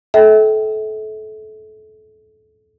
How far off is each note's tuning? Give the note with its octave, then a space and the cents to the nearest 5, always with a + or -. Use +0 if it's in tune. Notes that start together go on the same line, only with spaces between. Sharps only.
A4 -30 E5 -30 G5 -10